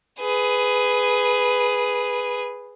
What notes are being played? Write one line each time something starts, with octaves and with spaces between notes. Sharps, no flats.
G#4 B4